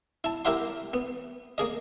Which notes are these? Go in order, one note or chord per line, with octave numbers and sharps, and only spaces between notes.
E4 A5
E4 G4 A#4 E5 F#5 C6
B3
A#3 G#4 D#5